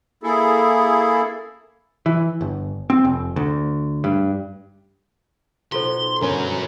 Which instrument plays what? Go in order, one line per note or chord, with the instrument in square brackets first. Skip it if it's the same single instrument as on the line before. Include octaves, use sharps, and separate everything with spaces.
[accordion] A#3 E4 G#4 A4
[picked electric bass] E3
G1
C4
F1
D2
G2
[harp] B1 [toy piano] F4 A4 C5 [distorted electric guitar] C6
[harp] G1 [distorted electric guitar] F#2 F#3 [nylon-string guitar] C#4 A#4